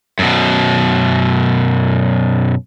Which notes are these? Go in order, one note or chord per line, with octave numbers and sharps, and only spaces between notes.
F#2 B2